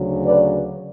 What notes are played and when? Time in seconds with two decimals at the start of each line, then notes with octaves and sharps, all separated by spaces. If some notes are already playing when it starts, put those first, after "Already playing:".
Already playing: D2 C#3 F#3
0.25 B4 D5